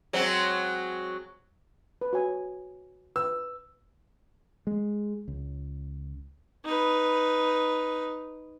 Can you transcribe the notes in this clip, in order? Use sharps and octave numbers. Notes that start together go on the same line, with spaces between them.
F#3 G#3 C4
B4
F#4 C#5 G#5
B4 E6
G#3
C#2
D#4 B4